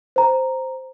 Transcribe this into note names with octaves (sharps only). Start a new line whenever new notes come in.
C5 A#5